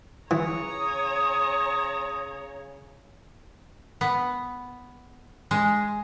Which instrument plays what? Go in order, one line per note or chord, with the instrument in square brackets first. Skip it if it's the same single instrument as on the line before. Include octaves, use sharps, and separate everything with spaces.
[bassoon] C#3 [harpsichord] E3 [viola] C#5 A#5 [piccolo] D#6
[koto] B3
G#3